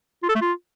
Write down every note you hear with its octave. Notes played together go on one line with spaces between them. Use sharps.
F4
A4
A3
F4